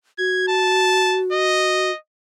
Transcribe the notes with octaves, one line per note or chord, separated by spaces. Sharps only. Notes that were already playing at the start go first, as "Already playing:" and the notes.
F#4 G#6
A5
D#5